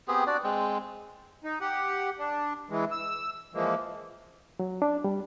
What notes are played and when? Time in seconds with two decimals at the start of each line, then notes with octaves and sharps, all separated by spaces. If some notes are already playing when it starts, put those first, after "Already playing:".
0.08 B3 C4 G4 G#4
0.27 D4 F#4 D5
0.44 G#3 C4
1.44 D#4
1.61 G4 F#5
2.19 D4
2.70 E3 G#3
2.91 E6
3.54 E3 F3 G#3 A#3
4.59 F#3
4.82 D4
5.04 G3